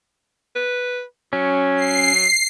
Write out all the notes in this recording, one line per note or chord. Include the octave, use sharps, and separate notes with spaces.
B4
F#3 C#4
C7